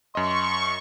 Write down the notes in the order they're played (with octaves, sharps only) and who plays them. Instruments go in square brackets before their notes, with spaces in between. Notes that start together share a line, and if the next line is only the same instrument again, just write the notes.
[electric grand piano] F#2 D#5 [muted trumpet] C6 [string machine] C#6